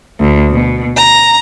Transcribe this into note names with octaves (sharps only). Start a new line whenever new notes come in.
D2
B2
A#5